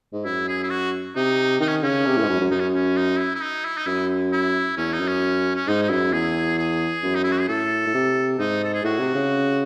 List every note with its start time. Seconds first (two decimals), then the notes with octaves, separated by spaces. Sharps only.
0.13 G#2
0.25 F#2 E4
0.48 G#4
0.63 E4
0.70 F#4
1.16 C3 D#4
1.60 D#3 D#4
1.68 C#4
1.83 C#3 C#4
2.06 C3
2.17 A2
2.23 G#2
2.29 F#2
2.41 F#2
2.51 F#2 D#4
2.59 C#4
2.74 C#4
2.96 D#4
3.19 E4
3.35 E4
3.42 D#4
3.65 E4
3.77 D#4
3.86 F#2 E4
4.32 E4
4.77 E2 C#4
4.93 D#4
5.00 F#2
5.07 C#4
5.55 C#4
5.67 G#2 D#4
5.82 D#4
5.90 F#2 E4
6.13 E2 G#4
6.58 G#4
7.03 F#2
7.15 D#4
7.24 E4
7.32 F#4
7.40 G#4
7.48 A2 A4
7.87 A2
7.94 C3
8.38 G#2 D#4
8.64 A4
8.74 G#4
8.84 A2 F#4
8.99 C3
9.14 C#3